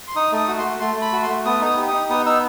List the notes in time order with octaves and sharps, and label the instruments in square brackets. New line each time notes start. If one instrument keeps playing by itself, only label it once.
[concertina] C6
D#4 D#6
A3 D#6
F#4
C6
A3
A3 C6
A3
B5
F#4
C6
A3
B3 D#6
D#4 D#6
G4
D#6
D#4
B3 D#6
D#4 E6